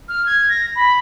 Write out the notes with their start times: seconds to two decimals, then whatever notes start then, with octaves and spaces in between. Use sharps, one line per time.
0.09 F6
0.26 G#6
0.49 A#6
0.76 B5